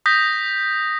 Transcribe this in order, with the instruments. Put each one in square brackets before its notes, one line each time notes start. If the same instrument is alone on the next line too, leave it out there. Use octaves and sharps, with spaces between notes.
[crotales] D#6 G6 A#6 B6